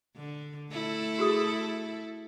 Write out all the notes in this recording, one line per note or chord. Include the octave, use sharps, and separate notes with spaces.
D3
A3 E4 A4
F#4 G#4 D#6